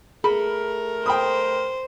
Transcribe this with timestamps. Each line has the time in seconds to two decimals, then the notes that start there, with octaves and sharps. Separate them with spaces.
0.24 A3 G#4 A#4 B5
1.06 C5 G5 B5 D#6